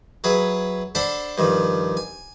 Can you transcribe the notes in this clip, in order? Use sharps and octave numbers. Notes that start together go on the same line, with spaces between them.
F#3 G#4 B4 E5
D4 A4 C5 D5 F#5 B5
G2 D#3 F3
G#5